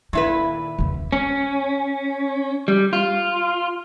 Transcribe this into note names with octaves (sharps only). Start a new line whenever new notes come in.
A#2 D#3 E4 B4
E2 C#3
C#4
G3
F4